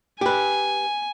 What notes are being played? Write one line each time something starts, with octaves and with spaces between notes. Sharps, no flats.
G4 B4 G#5